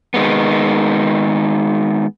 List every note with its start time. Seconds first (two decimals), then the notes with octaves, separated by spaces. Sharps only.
0.14 D#3 G#3 B3